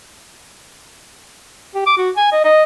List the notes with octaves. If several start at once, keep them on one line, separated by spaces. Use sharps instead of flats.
G4
D6
F#4
G#5
D#5
D#5